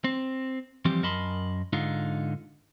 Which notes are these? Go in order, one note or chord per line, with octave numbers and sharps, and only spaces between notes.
C4
E3 F3 G3 C4 G4
F#2 A#4 D#5 A5 B5 C6
G#2 D3 D#4 F4